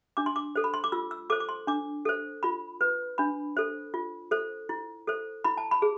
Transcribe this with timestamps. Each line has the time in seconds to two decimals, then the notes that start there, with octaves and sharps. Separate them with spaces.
0.17 D4 D6
0.26 C6
0.36 D6
0.56 A4 C5
0.64 B5
0.74 C6
0.84 D6
0.92 F4 E6
1.11 E6
1.30 A4 C5 D6
1.40 D6
1.49 C6
1.67 D4 D6
2.05 A4 C5
2.43 F4 B5
2.81 B4
3.18 D4 B5
3.57 A4 C5
3.94 F4
4.31 A4 C5
4.69 E4
5.07 A4 C5
5.44 E4 B5
5.57 A5
5.71 B5
5.82 G#4